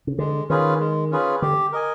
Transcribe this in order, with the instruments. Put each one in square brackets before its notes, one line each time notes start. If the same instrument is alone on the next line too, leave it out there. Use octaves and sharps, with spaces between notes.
[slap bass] C#3
[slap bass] D3 [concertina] G#3
[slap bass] D#3 [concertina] C#4 F4 G#4 B4
[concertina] G#3
C#4 F4 G#4 B4
[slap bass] D3 [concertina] G4
[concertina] A#4 D#5 G#5